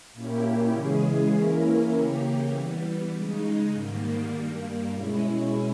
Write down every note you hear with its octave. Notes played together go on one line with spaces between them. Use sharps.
A#2 A#3 C#4 E4 G4
C#3 E3 G#3 C#4 G#4
E3 A#3 C#4 E4 A#4
C#3 E3 A#3 C#4 G4
E3 G3 B3
C#3 G#3 D#4
G#2 D#3 G3 A#3
G2 G3 A#3
B2 G#3 C#4 E4